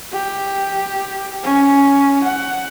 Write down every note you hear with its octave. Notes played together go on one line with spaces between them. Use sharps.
G4
C#4
F#5